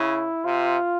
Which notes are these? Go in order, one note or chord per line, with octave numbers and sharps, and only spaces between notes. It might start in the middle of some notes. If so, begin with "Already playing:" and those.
Already playing: C#3 E4
C3 F4